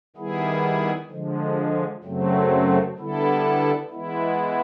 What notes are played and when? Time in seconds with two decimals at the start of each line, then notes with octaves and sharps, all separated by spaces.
0.16 D#3 G3 B3 E4 G#4
1.10 D3 F3 G#3
2.04 F#2 C#3 F#3 A3 C4
2.97 D3 G3 B3 E4 A4
3.90 E3 G#3 B3 E4